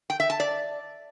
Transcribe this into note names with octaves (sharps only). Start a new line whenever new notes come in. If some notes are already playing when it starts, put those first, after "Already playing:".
G5
E5
A5
D5